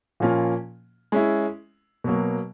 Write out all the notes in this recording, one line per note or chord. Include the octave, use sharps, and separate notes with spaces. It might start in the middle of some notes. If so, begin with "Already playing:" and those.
A#2 F3 A#3 C#4 F4
G#3 C#4 E4
B2 F#3 A#3